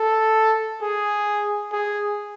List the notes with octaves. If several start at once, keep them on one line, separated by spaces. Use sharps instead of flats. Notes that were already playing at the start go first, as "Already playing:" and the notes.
Already playing: A4
G#4
G#4